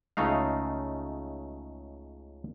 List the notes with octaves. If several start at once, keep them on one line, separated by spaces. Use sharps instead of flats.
C#2 C#3 A3 D#4 F5